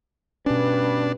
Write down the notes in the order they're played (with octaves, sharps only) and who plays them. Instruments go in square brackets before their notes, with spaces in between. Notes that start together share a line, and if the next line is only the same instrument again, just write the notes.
[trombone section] G2 B4 [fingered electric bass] B2 C#4 [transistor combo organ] D4